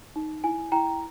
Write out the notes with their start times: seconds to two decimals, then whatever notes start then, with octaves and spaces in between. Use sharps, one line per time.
0.16 D#4
0.44 E4 G#5
0.72 E4 G5 A#5